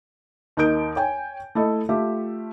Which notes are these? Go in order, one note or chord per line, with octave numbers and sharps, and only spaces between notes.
D#2 D#4 A#4 D#6 G6 D7
C#5 G5 G#5
A3 E4 A4 D#5
A3 F4 G4 E5